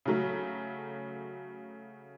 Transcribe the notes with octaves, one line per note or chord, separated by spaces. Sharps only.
C#3 F#3 A3